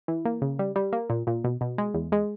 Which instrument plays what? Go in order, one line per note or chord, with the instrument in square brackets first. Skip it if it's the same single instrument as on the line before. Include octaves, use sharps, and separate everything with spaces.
[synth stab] E3
A#3
C#3
G3
G3
A#3
A#2
A#2
B2
B2
G#3
E2
G#3